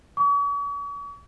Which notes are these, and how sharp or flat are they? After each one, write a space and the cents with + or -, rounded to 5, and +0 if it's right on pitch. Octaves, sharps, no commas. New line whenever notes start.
C#6 +45